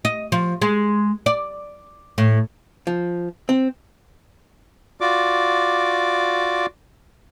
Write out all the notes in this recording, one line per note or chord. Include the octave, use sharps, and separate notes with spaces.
D#5
F3
G#3
D5
A2
F3
C4
F4 F#4 D5 D6